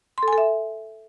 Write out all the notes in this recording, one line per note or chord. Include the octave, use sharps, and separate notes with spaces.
C6
A4
G#5
A4
E5